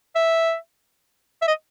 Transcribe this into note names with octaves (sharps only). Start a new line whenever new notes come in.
E5
E5
D#5